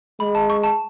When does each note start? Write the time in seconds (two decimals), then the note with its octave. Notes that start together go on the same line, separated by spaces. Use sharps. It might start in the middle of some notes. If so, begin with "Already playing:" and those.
0.20 G#3 B5
0.35 A5
0.50 C#6
0.63 A5